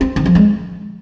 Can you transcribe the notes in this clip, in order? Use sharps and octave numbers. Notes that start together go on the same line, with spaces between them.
C4
D#3
F3
G#3